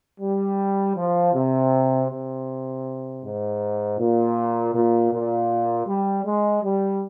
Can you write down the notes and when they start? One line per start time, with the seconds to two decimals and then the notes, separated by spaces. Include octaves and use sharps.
0.20 G3
0.96 F3
1.33 C3
2.09 C3
3.22 G#2
3.98 A#2
4.74 A#2
5.11 A#2
5.86 G3
6.24 G#3
6.62 G3